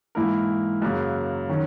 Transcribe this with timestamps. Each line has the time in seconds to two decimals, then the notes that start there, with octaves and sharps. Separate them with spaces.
0.15 G#2 E3 A#3 E4 A#4
0.82 F#2 C#3 F#3 A#3
1.49 D#3 F#3 C#4